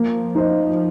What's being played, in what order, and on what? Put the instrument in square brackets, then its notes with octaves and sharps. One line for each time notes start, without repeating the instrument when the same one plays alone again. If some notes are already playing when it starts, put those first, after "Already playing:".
Already playing: [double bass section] F3 [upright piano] A#3
[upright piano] D#4 C5 D#5